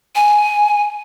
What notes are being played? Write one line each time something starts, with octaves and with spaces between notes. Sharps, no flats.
G#5